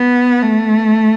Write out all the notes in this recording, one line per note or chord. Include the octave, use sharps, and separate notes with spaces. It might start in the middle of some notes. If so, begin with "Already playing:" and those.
Already playing: B3
A3